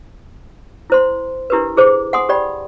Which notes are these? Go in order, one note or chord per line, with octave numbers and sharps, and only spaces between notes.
E4 C5 C6
D4 E4 G4 A#4 B4
E4 G#4 C5 D6
F#5 G#5 C6 D#6
G4 D5 G5 B5